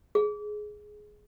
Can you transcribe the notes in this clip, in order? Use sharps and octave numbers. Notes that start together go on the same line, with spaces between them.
G#4